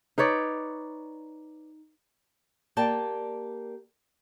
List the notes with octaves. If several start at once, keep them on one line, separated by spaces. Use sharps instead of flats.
D#4 B4 C#5 D5
A#3 G4 D5 G5 A5